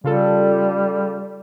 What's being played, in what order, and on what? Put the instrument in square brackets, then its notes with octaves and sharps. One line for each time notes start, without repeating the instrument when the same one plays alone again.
[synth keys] C#3 F4 A4 [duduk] G3